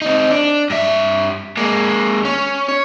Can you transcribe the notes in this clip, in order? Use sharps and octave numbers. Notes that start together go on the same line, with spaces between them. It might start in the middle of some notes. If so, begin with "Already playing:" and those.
C4 D#4
D4
G2 E5
G#3 A#3
C#4
C#5